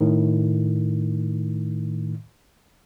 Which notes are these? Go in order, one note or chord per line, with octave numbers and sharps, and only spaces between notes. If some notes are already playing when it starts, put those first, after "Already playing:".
A2 D#3